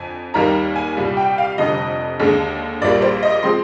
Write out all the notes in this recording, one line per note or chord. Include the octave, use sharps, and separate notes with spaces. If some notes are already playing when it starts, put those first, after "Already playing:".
Already playing: F2 D3 G#5
D#2 D#3 G3 A#3 A#5
G#5
C2 A#2 G3
G5
F5
F1 F2 D3 G3 D#5
D#2 D3 G#3
A#1 A#2 G3 A#3 D5
C5
D#5
F3 G#3 C4 C6